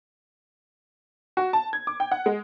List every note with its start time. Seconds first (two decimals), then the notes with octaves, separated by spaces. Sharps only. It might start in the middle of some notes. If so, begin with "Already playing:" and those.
1.37 F#4
1.53 A5
1.73 G#6
1.87 D6
2.00 G5
2.12 F#5
2.26 G#3